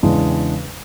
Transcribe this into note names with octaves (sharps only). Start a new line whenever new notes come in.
E2 C#3 E3 G#3 D4